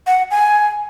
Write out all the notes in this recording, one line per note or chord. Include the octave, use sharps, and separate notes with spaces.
F#5
G#5